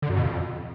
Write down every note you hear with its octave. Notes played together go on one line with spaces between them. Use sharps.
D3
F#2
B2
F2